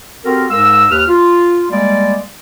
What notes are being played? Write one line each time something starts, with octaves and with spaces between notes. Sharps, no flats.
C4 F#4 G4 A4 A#4
G#2 G#3 A#4 F5 E6
D#2 B4 F6
F4
G3 G#3 A#3 D5